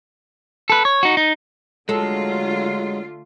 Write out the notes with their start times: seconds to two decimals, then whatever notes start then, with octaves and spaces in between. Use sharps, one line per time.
0.70 A4 B4
0.85 C#5
1.03 D#4 F#4
1.17 D#4
1.89 D3 F#3 G#3 A3 F4 A4